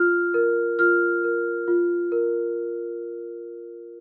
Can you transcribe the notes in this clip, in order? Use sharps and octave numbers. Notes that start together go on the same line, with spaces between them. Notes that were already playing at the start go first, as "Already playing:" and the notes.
Already playing: F4 F6
A#4
F4 F6
A#4
F4
A#4